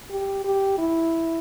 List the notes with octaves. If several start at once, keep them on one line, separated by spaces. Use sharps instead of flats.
G4
G4
E4